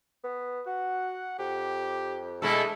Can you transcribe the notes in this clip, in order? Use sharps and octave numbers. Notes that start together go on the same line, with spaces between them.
B3
F#4 F#5
F2 G4
B2 G#3 A3 D4 E4 A4